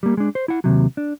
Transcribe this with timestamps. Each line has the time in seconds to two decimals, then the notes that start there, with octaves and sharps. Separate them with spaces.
0.03 G3 A#3
0.17 G#3 D4
0.35 C5
0.48 E4 F#5
0.64 D#2 A2 C3 F#3
0.97 D4